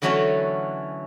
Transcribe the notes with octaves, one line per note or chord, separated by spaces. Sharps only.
D3 E3 F#3 A3 C#4 F#4